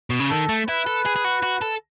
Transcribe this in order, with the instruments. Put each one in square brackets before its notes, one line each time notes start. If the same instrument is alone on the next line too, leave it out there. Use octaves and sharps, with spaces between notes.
[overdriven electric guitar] B2
C#3
[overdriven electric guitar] D#3 [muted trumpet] A4
[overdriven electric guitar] A3
[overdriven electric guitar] E4 [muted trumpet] B4
[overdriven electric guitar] A4
G#4
G#4
F#4
F#4
A4